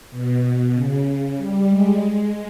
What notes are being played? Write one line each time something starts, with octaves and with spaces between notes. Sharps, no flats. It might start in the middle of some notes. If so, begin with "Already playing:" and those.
B2
C#3
G3
G#3
G#3